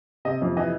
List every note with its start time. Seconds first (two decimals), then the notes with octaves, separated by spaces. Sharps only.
0.25 C3 D#5
0.42 F2
0.57 E3 D#5